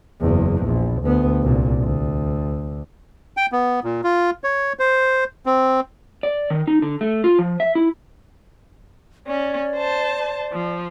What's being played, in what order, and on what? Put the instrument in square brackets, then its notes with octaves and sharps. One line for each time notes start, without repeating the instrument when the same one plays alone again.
[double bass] F#1 E2
A#1
D2 B3
C2 A#2
D2
[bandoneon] G5
B3
A#2
F4
C#5
C5
C4
[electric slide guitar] D5
D#3
D#4
D3
A3
F4
F3
E5
E4
[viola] C#4 [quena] D5
[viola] C5 A5
F3